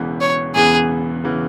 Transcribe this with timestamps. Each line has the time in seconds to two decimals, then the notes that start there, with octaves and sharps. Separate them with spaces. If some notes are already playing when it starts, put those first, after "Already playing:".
Already playing: E1 E2 C#3 E3 B3
0.21 C#5
0.55 E1 E2 C#3 E3 B3 G#4
1.24 C#3 E3 B3